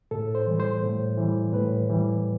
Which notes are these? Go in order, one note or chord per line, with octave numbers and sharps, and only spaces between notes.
A2 A4
C5
E3 G3
C5
A2
E3 G3
A2 B4
E3 G3